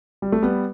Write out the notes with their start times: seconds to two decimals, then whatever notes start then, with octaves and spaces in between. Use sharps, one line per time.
0.22 G3
0.32 A3
0.42 G3 B3